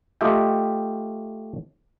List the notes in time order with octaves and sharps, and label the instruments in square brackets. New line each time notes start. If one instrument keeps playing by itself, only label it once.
[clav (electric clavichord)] A3 F4 G4 D#5 E5 G5